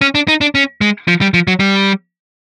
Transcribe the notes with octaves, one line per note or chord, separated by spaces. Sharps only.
C#4
D4
D#4
D4
C#4
G#3
F3
G3
F3
F#3
G3